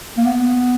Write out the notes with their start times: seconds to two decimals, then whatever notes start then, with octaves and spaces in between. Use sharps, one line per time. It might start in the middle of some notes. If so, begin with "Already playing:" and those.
0.17 A#3
0.25 B3